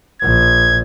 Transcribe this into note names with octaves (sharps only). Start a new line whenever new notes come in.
A#1 G#6